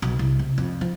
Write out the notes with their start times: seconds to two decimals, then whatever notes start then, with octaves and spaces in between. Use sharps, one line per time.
0.02 B1
0.19 C2
0.39 C3
0.58 F2
0.81 F3